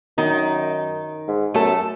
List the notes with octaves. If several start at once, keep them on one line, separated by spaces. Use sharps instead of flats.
F#2 D#3 D#4
G#2
F#2 A3 A4